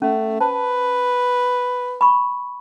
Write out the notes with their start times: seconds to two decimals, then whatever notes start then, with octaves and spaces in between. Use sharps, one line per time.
0.02 A3 C#4
0.41 B4 C5 A5
2.01 B5 C#6